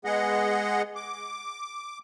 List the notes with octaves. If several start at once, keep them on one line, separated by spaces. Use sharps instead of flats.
G#3 B3 G#4 D#5 F#5
D6